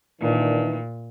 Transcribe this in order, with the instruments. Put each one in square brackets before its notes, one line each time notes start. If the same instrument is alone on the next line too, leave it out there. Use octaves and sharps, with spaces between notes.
[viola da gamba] A#2 [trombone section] D#3 E3 D4